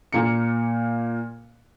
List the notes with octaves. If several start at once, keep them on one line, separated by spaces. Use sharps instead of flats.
A#2 A#3 C#7